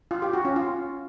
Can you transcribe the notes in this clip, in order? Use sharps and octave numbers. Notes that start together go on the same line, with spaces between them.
F4
G4
F#4
C#4
F4